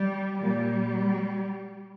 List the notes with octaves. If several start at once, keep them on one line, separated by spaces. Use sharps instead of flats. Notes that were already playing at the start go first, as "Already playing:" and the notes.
Already playing: G3
A#2 G3